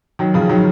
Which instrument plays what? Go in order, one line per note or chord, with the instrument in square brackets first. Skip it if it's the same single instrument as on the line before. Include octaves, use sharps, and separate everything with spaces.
[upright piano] D#3 F#3
C#3 F3
D#3 F#3